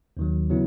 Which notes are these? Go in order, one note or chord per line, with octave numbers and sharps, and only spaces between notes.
D#2 D#3 F#3
C#3 F#3 B3 E4